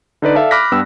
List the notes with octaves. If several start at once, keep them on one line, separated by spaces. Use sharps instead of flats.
D3 D#4 B4 D5
A4 D5 E5 F5 A5
B5 D6 F6 F#6 A#6 B6
G2 B3 G5 E6